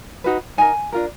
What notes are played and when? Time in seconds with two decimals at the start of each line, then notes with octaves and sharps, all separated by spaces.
0.24 D#4 F#4 B4
0.58 D#4 A#4 G#5
0.92 D4 F4 A#4